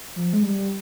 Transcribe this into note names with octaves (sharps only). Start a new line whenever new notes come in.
F3
G#3
G3